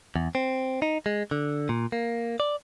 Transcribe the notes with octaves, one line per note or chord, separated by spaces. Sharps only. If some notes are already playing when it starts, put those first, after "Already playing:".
E2
C4
D#4
G#3
D3
A#2
A#3
D5